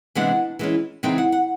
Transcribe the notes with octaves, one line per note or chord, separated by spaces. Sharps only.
C3 E3 G#3 B3 D4 F#5
E3 G#3 C#4
C#3 E3 G#3 C4 D#4 G5
F#5
F#5